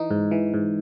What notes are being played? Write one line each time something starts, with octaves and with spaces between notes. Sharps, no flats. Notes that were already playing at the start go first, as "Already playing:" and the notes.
Already playing: E3 D#4
G#2
E3
G#2